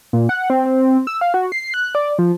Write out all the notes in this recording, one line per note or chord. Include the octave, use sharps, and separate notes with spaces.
A#2
F#5
C4
C4
E6
F5
F#4
C7
F#6
D5
F3